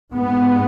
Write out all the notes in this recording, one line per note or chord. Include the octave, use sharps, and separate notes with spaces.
G#2 B3